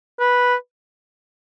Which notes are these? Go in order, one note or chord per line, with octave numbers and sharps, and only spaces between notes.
B4